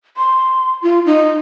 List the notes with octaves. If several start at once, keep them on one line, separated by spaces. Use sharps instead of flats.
C6
F4
D#4